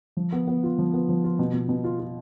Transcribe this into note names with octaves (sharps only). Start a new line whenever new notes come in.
F3
B3
B3
F4
F3
B3
F3
F4
B2
B2
B2
F4
F4